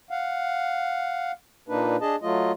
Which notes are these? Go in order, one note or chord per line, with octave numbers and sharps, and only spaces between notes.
F5 F#5
A#2 A#3 D4 D#4 B4
D4 G#4 D#5 A5
F#3 A3 F4 D#5